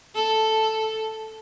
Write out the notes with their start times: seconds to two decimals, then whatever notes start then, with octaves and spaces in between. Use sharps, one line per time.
0.15 A4